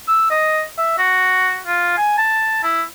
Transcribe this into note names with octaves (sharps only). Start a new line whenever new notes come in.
E6
D#5
E5
F#4
F4
G#5
A5
E4